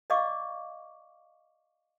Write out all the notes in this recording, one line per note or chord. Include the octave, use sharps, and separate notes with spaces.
D5 D#5 F5 C#6 D6